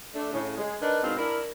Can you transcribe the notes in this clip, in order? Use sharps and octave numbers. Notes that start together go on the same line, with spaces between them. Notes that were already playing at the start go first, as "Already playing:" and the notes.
A3 D4
A2 C#3
G#3
D4 D#4 A#4 B4
G#2 B2 C4 F4
D4 E4 A#4